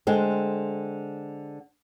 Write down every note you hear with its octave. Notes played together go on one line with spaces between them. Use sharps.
D3 G#3 C4